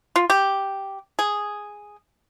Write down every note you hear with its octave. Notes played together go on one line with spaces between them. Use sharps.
F4
G4
G#4